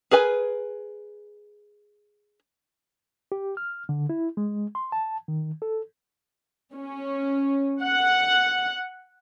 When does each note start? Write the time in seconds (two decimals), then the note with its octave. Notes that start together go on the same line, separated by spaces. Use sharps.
0.11 G#4 A#4 B4 G#5
3.32 G4
3.57 F6
3.89 D3
4.09 E4
4.37 G#3
4.75 C6
4.92 A5
5.28 D#3
5.62 A4
6.74 C#4
7.82 F#5